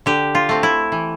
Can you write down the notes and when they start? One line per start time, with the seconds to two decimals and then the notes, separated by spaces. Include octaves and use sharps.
0.06 D3 G4
0.35 F4
0.49 A3 C4
0.63 E4
0.92 E3